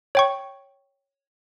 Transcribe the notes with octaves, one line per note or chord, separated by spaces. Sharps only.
C#5 G5 C#6